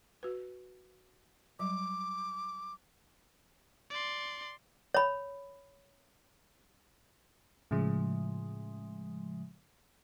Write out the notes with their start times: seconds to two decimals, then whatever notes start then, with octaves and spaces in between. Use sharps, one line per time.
0.23 F#4 B4
1.59 F#3 G3 D6
3.90 D5 C6
4.94 C#5 B5
7.71 A2 C#3 F3 G#3